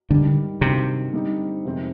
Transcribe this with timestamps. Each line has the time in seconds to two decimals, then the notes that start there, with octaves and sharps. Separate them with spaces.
0.09 G#2 D3 D#3 G3
0.61 G2 C3 D#3 F#3
1.13 D3 G3 C4 D#4
1.65 F2 C3 D#3 G#3 C4